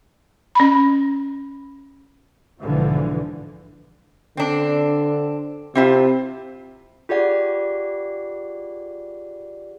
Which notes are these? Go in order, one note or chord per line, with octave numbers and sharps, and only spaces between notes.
C#4 B5
B1 G#2 D3 E3 F3
D3 C4 D4
C3 C4 E4 F4
F4 G4 G#4 D5 F#5